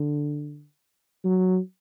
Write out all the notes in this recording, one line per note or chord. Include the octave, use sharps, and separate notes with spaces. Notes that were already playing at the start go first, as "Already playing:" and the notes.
Already playing: D3
F#3